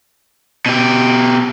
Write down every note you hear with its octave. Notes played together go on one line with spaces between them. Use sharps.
B2 G4